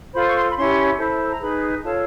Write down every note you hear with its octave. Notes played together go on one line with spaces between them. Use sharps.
F4 A4 C5 B5
C#6
C6
B5
C#4 E4 G4 C6
E4 A4 C5
A#5
D#4 G#4 B4 B5
F4 A4 C#5 A5